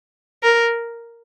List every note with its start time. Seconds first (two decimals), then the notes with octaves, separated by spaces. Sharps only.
0.43 A#4